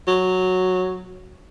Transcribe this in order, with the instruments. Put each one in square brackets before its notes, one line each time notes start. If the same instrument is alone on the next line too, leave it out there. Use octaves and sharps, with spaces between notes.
[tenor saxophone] F#3